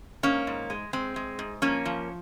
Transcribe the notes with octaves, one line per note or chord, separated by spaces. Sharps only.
G#2 A#3 C#4
G#2
G#3
G#3 C4
G#3
G#2
F3 A#3 C#4
F3